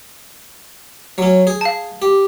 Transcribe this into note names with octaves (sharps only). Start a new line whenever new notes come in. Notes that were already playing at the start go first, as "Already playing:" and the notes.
F#3 C#4
G#4
F5 A5
G4